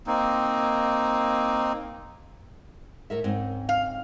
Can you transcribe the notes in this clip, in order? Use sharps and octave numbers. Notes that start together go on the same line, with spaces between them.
A#3 C4 D#4
A2 A#4 E5
G#2 C4 C#4
F5